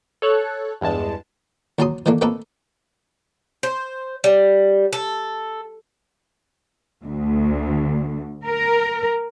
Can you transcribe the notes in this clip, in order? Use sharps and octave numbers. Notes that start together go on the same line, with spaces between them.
A4 C#5 F#6
E2 G2 G#3 A5
D#2 F#3 A5 A#5 C6 D#6
D#3 E3 A3 A#3 D4
A3 A#3 C4 D#4 A4 B4
C5
G3
A4
D2
A#4